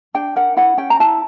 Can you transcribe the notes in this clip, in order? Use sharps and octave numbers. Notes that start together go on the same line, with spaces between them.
D4 G5
A#4 F#5
E4 F#5
C#4 G5
A#5
E4 A5